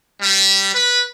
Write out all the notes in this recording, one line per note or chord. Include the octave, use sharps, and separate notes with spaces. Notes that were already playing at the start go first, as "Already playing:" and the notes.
G3
B4